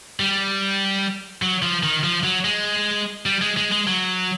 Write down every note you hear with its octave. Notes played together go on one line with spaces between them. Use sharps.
G3
F#3
F3
D#3
F3
F#3
G#3
G3
G#3
G#3
G#3
F#3